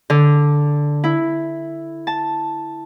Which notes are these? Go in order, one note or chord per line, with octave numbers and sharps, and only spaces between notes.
D3
E4
A5